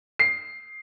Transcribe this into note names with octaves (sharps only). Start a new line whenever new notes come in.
C7